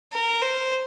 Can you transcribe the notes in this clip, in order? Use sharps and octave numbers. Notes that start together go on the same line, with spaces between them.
A#4
C5